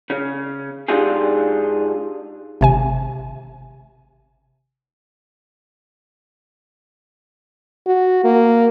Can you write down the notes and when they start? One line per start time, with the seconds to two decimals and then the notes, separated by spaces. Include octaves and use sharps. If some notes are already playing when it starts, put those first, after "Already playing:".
0.10 C#3 C#4
0.88 G#2 D4 D#4 F4 G4 G#4
2.61 G#1 C3 G#5
7.86 F#4
8.24 A#3